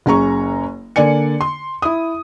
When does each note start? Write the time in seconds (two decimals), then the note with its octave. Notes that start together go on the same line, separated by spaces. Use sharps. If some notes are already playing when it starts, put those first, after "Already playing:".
0.06 F#1 C#4 G#4 A#5 C#6
0.96 D3 A#3 D5 G#5 C#7
1.41 C6
1.82 E4 D#6